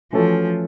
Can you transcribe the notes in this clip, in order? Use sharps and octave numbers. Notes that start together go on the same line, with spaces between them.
E3 F3 A3 C#4 F#4 A4